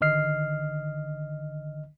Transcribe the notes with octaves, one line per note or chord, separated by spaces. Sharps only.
G#1 D3 D#3 D#5 F6 C7